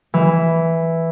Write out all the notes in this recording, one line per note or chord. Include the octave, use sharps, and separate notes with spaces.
E3